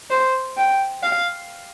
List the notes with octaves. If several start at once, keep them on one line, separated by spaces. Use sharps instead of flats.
C5
G5
F5